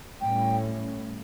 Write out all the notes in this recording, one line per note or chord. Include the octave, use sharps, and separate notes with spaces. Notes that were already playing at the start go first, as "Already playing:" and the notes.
A2 G3 C#4 G5